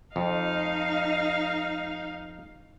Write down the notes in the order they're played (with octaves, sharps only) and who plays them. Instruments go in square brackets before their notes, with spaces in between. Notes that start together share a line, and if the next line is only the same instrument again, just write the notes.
[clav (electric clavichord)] F2 [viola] D#4 F5